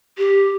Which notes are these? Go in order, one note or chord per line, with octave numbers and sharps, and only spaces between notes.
G4